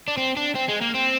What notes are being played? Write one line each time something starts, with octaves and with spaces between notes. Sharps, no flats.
D4
C4
D4
C4
G#3
A#3
C4